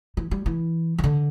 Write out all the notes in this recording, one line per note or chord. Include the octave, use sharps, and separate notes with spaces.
E3
G3
E3
E3
D3